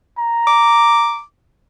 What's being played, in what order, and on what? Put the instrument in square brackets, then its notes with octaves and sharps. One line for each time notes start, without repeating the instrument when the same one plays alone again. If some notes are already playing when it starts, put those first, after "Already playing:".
[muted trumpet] A#5
[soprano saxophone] D6